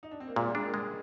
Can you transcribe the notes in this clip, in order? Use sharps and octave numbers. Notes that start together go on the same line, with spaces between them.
D#4
D4
C4
A#3
A#2 G#3
G3
G#3 D4
A#3
G#3